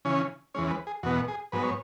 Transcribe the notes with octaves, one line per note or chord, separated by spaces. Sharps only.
C#3 E3 C#4 C#5
E2 E3 G#3 C#4 C#5
B4
G#4
E2 B2 B3 F#4
G#4
G#2 F#3 B3 B4
C#5